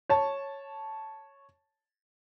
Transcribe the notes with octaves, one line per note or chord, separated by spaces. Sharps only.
C#5 A5